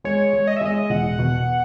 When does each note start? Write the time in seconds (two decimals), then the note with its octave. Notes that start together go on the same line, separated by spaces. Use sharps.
0.04 G#3 C#5
0.33 G#3
0.47 D#5
0.56 E5
0.61 G#3 D#5
0.90 E1 F#5
1.19 B2